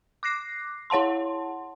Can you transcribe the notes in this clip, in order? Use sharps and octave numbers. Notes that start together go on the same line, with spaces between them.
D6 F#6 A#6 C7
E4 C#5 F#5 A5 C6